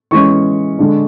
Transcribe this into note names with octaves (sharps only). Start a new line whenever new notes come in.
E3 G#3 C#4 C#6
D3 G#3 D4